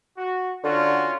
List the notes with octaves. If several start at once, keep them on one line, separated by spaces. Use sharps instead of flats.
F#4
D3 C#4 F4 F#4